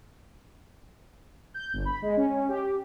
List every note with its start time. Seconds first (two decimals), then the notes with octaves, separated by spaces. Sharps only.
1.54 G6
1.73 G1
1.85 B5
2.02 G#3
2.17 C#4
2.49 G4